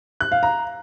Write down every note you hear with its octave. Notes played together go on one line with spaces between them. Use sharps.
F#6
F5
A#5